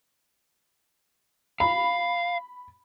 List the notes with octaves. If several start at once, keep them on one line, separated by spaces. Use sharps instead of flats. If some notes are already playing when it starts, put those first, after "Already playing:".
F5 B5